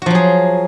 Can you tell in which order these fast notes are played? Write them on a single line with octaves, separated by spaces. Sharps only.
F#4 F3 F#3 G#4